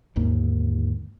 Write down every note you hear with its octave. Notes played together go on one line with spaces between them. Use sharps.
G1 D#2 G#2 A#3